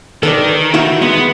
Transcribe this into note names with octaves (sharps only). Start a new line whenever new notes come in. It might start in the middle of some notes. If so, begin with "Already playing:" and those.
D#3 A4 B4 D5
E4 F#4 E5
G#3 B3